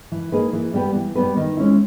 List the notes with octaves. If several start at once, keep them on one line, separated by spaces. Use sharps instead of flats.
E3
A#3 D#4 G#4 B4
E3
G3 B3 G4 B4
E3
G3 B3 G4 B4
D#3
G#3 C#4 E4